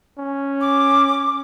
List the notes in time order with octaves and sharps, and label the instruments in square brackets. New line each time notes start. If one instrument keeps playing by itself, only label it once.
[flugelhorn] C#4
[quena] D6